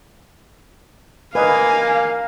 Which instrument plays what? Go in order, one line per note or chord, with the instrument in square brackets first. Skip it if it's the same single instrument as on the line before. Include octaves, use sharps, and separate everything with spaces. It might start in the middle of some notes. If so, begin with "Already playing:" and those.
[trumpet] A#3 [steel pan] B4 D#5 [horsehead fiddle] F5 [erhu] G#5